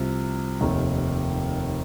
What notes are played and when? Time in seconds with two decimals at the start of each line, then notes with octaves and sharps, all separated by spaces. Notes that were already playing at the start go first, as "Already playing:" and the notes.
Already playing: C2 C3 F3 C4
0.61 F1 D#2 D#3